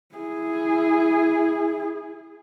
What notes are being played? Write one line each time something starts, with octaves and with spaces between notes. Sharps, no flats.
E4 G#4